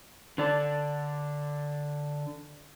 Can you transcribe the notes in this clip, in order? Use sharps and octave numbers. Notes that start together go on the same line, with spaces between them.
D3 D5 A5